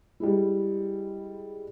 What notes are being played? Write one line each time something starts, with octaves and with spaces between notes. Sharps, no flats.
G3 G#3 E4